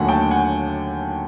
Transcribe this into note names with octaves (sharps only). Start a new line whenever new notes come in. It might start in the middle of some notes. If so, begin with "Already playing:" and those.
Already playing: D#2 D3 F#3 A3 F#5 G#5
G5 A5
F#5 G#5